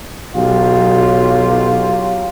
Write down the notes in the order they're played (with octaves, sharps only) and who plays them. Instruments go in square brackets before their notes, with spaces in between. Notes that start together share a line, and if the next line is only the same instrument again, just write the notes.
[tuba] B1 [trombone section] F#3 F4 G4